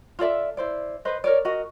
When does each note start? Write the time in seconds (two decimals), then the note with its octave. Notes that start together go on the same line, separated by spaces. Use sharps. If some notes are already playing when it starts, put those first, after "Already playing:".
0.19 F4 A4 D5 E5
0.57 E4 C5 D5
1.05 B4 C5 D#5
1.24 A#4 C#5 D5
1.45 F#4 A#4 D#5